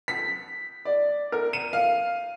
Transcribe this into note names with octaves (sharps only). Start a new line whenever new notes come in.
B6
D5
A#4
D#7
F5